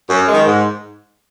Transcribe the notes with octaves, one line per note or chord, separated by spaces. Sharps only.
F#2
D#3 G#3
G#2